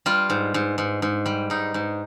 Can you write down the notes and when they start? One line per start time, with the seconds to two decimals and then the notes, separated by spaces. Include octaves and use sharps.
0.06 G3 F4
0.30 G#2
0.54 G#2
0.78 G#2
1.02 G#2
1.26 G3
1.50 G#2 D#4
1.74 G#2